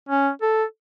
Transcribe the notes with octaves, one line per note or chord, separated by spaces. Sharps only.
C#4
A4